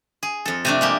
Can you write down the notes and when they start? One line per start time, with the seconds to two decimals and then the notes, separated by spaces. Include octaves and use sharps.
0.23 G#4
0.45 F2 A4
0.65 C3 A3 D4
0.81 G#3 A#3 G4